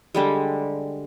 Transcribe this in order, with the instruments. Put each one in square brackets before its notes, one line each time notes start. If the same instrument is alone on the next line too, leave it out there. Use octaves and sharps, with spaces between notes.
[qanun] D3 G3 G#3